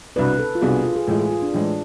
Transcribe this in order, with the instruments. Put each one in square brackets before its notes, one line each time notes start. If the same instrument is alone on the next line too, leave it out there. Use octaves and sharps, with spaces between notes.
[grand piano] C2 B2 B3 D4 [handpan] B4
[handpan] A4
F4
[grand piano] C2 B2 B3 D4 [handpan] G#4
[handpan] F4
G#4
[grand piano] A2 E3 G#3 [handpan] F4
[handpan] G#4
F4
D4
[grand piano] A2 E3 G#3 [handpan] D4